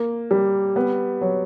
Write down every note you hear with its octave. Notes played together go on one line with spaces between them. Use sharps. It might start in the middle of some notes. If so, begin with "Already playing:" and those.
Already playing: A#3
G3
B3
F#3